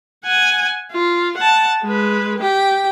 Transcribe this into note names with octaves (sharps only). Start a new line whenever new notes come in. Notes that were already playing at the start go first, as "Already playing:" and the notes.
F#5 G#5
F4
F#5 A5
G#3 B4
G4 G5